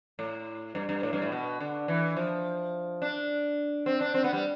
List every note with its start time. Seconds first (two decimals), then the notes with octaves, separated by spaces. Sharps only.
0.19 A2
0.75 G2
0.89 G2
1.03 A2
1.13 G2
1.22 A2
1.32 B2
1.60 D3
1.88 E3
2.17 F3
3.02 D4
3.86 C4
4.01 D4
4.14 C4
4.24 B3
4.33 G3